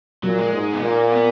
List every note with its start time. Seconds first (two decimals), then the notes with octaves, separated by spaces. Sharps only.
0.24 A#2 F#3
0.39 G#3
0.54 G#2
0.73 B3
0.82 A#2 A#3
1.12 B3